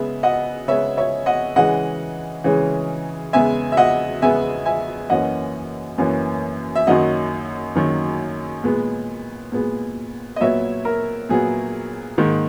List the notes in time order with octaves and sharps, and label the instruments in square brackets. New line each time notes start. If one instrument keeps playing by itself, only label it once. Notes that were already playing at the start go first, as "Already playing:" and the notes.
Already playing: [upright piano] C#3 G#3 B3 E5
D#5 F#5
C#3 G#3 B3 C#5 E5
C#5 E5
D#5 F#5
C#3 E3 G#3 C#4 D#5 F#5
C#3 E3 G#3 C#4
E2 C#3 G#3 B3 E5 G#5
E5
D#5 F#5
E2 C#3 G#3 B3 E5 G#5
E5 G#5
F#2 E3 A#3 C#4 D#5 F#5
F#2 E3 A#3 C#4
E5
F#2 D#3 F#3 A#3 D#5 F#5
F#2 D#3 F#3 A#3
A#2 G#3 B3
A#2 G#3 B3
D#5
A#2 F#3 B3 C#5 E5
A#4
A#2 F#3 B3 G#4
G#2 D#3 A#3